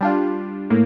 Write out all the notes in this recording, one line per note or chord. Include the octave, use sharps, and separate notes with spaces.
G3 D4 F4
A2 A#3